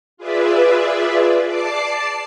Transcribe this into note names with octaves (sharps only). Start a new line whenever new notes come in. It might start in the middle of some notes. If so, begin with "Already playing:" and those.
F4 G#4 B4 D5 E5
D5 A5 D6 C7